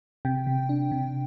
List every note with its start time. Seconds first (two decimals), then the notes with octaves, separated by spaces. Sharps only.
0.25 C3 G5
0.47 C3
0.69 D4
0.91 C3